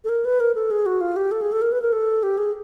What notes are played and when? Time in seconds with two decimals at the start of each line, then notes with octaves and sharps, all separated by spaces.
0.04 A4
0.09 A#4
0.25 B4
0.40 A#4
0.55 A4
0.71 G#4
0.86 F#4
1.01 F4
1.16 G4
1.31 A4
1.42 G#4
1.52 A4
1.62 A#4
1.72 B4
1.82 A#4
1.93 A4
2.23 G4
2.38 G#4